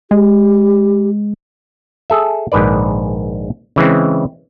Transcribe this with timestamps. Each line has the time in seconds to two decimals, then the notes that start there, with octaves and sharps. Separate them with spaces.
0.11 G#3 G4
2.10 G#4 A4 E5
2.52 A#1 G#2 D#3 B4 D5
3.76 C#3 E3 G#3 C4